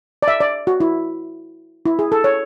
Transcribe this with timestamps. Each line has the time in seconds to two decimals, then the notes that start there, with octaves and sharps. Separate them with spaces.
0.22 D5
0.28 E5
0.40 D5
0.67 F#4
0.80 E4
1.86 E4
1.99 G#4
2.12 A4
2.24 C#5